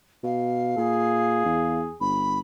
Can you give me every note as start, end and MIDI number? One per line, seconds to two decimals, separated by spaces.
0.23 0.74 47
0.23 1.79 77
0.77 1.41 46
0.77 1.99 68
1.45 1.91 40
2.00 2.40 31
2.00 2.38 83